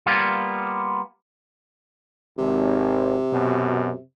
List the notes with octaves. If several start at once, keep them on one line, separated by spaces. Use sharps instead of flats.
G3 A#3 B3 F4
G#1 C3
F#2 B2